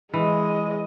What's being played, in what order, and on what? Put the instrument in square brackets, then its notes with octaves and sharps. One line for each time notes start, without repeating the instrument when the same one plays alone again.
[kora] E3 [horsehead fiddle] G#3 D#5